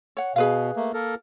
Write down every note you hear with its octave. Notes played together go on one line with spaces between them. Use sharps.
C#5 F#5
B2 G#4 B4 F5
A3 A#3
A#3 A4 A#4